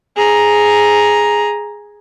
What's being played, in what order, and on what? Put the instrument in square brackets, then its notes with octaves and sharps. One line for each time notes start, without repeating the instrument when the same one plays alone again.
[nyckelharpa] G#4 A#5